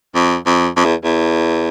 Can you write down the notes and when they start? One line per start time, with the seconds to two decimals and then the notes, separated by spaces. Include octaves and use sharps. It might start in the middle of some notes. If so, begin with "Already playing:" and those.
0.15 F2
0.46 F2
0.76 F2
0.85 E2
1.04 E2